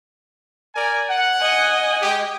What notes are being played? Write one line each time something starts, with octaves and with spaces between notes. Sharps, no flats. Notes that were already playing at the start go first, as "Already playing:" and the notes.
A#4 D5 G#5
F#5
D#5 G#5
G#3 G4